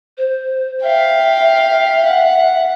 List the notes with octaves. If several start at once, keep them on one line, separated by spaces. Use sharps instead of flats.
C5
E5 F5 G5
F#5